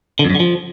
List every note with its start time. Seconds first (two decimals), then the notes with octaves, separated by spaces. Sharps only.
0.19 D3
0.24 F2
0.30 F#2
0.35 D3
0.40 F3